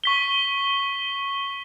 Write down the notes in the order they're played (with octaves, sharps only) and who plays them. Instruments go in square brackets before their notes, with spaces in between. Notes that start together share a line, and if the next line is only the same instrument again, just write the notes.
[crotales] C#6 B6 G7